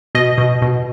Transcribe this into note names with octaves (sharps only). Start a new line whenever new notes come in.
B2 D#5
B2
B2